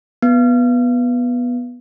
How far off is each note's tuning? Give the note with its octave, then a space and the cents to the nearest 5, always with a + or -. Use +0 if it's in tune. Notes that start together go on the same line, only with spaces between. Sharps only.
B3 -10